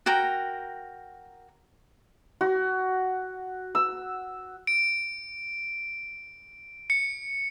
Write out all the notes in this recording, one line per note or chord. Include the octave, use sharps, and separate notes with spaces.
F#4 A#4 G5 A#5
F#4
E6
D7
C#7